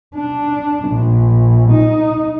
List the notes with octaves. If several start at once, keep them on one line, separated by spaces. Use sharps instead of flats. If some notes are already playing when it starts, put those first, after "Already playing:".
D4
A#1
D#4